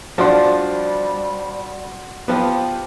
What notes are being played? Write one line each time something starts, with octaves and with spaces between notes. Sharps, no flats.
F3 G3 D4 F#4 C6
F3 B3 G4